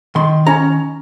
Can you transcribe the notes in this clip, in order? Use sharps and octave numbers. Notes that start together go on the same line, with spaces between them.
D#3 C6
C#4 A#5